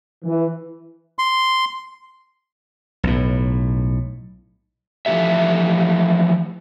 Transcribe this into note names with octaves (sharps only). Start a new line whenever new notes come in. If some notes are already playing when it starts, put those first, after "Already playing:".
E3
C6
B1 A2
E3 F3 A3 G4 E5